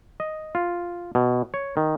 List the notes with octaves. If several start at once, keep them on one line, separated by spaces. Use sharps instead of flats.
D#5
F4
B2
C#5
D#3